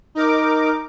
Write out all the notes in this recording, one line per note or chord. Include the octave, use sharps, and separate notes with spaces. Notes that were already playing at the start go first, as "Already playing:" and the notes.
D#4 A#4 D6